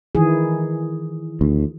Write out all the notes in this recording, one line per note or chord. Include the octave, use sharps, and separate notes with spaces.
D#3 E3 G#4
D2